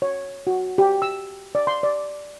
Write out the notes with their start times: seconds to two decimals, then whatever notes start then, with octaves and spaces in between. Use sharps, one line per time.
0.02 C#5
0.47 F#4
0.78 G4
1.02 E6
1.55 D5
1.67 C6
1.83 D5